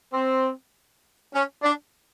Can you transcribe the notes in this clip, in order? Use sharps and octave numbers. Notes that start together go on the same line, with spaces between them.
C4
C#4
D4